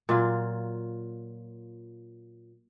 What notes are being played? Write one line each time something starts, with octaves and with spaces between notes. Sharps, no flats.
A#2 F#3 F4